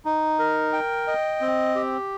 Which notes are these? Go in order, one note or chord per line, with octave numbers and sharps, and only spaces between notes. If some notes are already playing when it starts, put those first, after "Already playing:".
D#4
A#4
G5
D#5
C4
G4